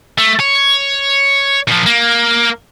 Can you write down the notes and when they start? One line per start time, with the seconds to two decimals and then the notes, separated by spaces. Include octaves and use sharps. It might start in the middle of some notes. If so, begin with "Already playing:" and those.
0.18 A3
0.40 C#5
1.68 A#2 F3
1.86 A#3